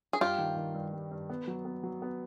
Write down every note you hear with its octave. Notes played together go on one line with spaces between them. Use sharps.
G#4
G2 F4 G4
D#3
D#3
G2
G3
G2
B3
F#3
B3
F#3
B3